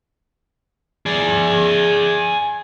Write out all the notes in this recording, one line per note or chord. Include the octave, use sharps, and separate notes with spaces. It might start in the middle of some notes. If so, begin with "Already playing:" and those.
G#4 D5